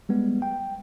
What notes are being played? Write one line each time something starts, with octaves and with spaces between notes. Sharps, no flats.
G3 G#3 B3
G5